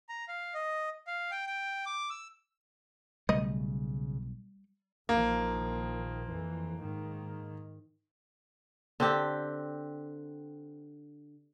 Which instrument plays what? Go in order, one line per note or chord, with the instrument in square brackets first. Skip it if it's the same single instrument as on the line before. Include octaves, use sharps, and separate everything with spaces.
[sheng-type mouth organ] A#5
F5
D#5
F5
G5
G5
D6
E6
[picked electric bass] B1 [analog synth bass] C#3 [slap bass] G3 A3 [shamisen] D#5
[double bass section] A#1 D#3 F3 [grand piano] A#3
[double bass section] F2 E3
G#2 D#3
[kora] D3 C4 G4